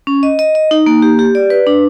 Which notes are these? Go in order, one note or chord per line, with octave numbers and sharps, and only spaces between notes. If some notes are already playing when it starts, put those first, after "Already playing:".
C#4
D#5
D#5
D#5
D#4
A#3
G4
G4
D5
B4
D4